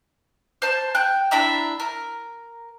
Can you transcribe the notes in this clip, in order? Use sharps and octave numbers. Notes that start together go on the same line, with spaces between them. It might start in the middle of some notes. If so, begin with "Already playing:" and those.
C5 A5
G5 F#6
D4 E4 E5 A#5
A#4